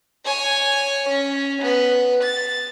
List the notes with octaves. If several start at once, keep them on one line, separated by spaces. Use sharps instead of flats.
C#5 G#5
C#4
B3 B4
A6